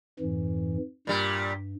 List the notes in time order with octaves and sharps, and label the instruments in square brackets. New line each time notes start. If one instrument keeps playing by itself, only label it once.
[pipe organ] F2 G#2 E3
[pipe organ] G2 [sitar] A#2 G3